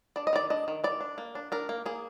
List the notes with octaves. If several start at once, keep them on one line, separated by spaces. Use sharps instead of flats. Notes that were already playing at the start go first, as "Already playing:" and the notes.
D4 D5
D#5
D#3 D5
D4 D#5
D#3
D#3 D5
D4
A#3
D4
D4 A#4
A#3
A#3 G#4